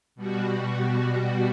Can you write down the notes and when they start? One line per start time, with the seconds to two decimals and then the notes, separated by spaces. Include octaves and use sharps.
0.15 B2 G3 F#4